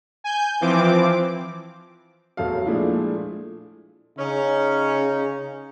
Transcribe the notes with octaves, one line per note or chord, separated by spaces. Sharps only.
G#5 G6
E3 F3 C4 D6
E1 A1 F#3 A4 F5
A#2 F3 G#3 A3 D4 E4
C#3 C#4 D#4